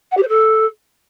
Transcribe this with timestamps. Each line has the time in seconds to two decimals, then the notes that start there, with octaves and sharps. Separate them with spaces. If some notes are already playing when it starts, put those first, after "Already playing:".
0.11 F#5
0.17 G4
0.23 C5
0.28 A4